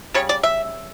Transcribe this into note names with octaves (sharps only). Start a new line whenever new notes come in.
C#3 G3 C#5
D5
E5